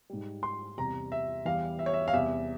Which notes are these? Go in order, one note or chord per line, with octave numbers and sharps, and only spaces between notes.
G#2 G3
C6
E2 C3 G3 A#5
E5
E2 E3 G3 F5
E5
C#5
E5
F5
E2 C3 G3 E5